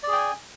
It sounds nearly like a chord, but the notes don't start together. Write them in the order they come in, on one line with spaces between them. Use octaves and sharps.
D5 G#4 G5 G#5